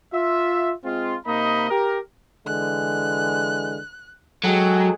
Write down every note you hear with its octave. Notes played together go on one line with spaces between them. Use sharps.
F4 E5
G#3 C4 F4
C3 A#3 D#4 D#5 B5
G4 A#4
D3 E3 G#3 F#6
F#3 G#3 G#4 A4 G5